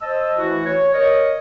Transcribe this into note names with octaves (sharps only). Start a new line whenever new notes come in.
C5 D#5 A5 E6
E3 A3 E4 F#4
C#5
A#4 C#5 D#5